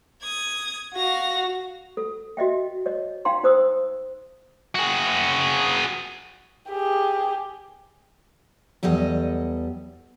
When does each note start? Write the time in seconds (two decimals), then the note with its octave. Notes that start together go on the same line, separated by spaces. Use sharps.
0.22 D#6 G#6
0.96 F#4 F5 A#6
1.97 A4
2.37 F#4 D#5 E5 G5
2.86 C#5 D#5
3.25 D#4 F5 G5 A#5 C6
3.43 D#4 C5 D#6 E6
4.75 F#4 G#4
6.69 G4 G#4
8.83 E2 F#3 G3 A4 D#5